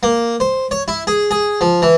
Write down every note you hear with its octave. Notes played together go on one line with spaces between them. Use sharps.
A#3
C5
C#5
E4
G#4
G#4
F3
E3